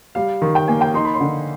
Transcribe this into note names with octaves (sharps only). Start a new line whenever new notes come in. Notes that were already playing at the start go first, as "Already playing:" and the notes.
G3 F5
D#3
G5
A#3 G#5
G5
D#4 C6
B5
C6
D3